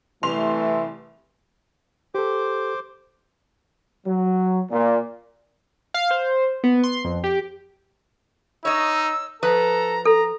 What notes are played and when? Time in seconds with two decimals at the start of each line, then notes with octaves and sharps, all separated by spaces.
0.23 C2 E3 A3 C6 F7
2.15 G4 A4 C5 D6
4.07 F#3
4.71 A#2
5.94 F5
6.11 C5
6.64 B3
6.84 C6
7.05 F2
7.24 G4
8.65 D#4 C#5 D#5 E6
9.43 F3 A4 B4 A#5
10.05 A4 A#5